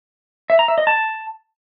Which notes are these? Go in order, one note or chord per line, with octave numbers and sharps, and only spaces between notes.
E5
A#5
E5
D#5
A5